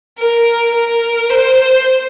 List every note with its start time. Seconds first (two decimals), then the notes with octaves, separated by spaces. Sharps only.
0.19 A#4
0.74 A#4
1.31 C5